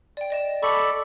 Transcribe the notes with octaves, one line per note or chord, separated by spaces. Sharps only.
D5 G5
D5 D#5 E7
A4 D5 B5 C#6 C#7